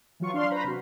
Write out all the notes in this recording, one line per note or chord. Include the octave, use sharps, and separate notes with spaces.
E3 F#3 F4 C#6
D4 F5 C6 F6
B4 C5 A#5 B5
C3 F#4